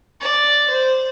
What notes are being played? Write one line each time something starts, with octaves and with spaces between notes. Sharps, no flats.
D5
C5